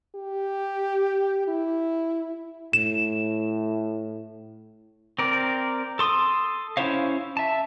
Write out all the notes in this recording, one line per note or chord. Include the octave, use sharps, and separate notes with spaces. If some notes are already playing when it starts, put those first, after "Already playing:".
G4
E4
A2 E7
C4 A#4 D5
A4 C6 D#6
C#4 E4 C5 C#5 F5
E5 A5